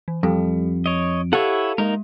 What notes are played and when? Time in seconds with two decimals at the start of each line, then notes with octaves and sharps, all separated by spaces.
0.08 E3
0.23 F2 G3 G4 A4
0.86 C#5 D#5 D7
1.33 E4 G4 A4 C#5 F5 F#5 D#7
1.78 G#3 A#3 D#4 A#4